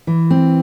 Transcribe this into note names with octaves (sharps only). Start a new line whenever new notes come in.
E3
C4